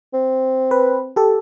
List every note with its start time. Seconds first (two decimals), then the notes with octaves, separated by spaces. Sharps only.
0.14 C4
0.71 B4
1.16 G4 A4